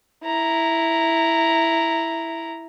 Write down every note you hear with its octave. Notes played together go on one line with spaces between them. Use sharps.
E4 A#5